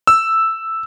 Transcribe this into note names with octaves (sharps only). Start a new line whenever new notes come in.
E6